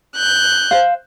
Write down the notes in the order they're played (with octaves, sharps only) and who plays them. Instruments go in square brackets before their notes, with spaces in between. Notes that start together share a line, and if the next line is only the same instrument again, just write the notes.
[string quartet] F#6 G6
[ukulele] C5 F5